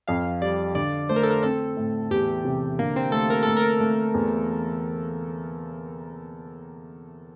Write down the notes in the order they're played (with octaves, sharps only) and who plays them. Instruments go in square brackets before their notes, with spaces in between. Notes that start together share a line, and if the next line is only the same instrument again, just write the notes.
[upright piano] F2 [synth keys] F5
[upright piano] G3 [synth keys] D5
[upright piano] D3 [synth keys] D5
[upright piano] A3 [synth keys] C5
[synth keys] A#4
A4
A#4
[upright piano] C4 [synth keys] A4
[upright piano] A2
[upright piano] E2 [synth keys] G4
[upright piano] C3
[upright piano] D3 [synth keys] A#3
[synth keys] C4
[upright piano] A3 [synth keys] A4
[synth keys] A#4
[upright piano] A3 [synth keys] A4
[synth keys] A#4
[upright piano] A3
E2